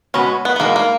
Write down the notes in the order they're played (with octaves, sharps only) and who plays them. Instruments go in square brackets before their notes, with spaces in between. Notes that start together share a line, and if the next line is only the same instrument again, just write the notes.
[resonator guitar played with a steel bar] B2 G#3 B3 F#4 [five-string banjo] C#4
[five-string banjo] B3
B3
[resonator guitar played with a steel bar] E2 B2 G#3 D#4 [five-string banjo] A#3
[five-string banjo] A#3